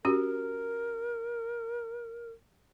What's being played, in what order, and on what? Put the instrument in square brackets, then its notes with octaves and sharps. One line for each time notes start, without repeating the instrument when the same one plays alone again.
[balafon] C#4 F#4 G4 [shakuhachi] A#4